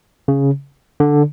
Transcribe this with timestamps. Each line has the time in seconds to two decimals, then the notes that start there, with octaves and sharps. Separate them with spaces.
0.28 C#3
1.00 D3